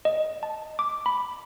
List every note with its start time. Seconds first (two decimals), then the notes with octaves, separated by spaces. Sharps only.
0.05 D#5
0.43 A5
0.79 D6
1.06 B5